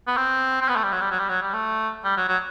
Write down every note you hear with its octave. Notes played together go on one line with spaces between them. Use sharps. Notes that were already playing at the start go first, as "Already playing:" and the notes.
B3
C4
C4
B3
A3
G3
F#3
G3
F#3
G3
F#3
G3
A3
G3
F#3
F#3